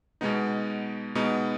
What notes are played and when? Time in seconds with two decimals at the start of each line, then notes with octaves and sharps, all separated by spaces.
0.21 B2 G#3 B3 D#4
1.15 B2 G#3 B3 D#4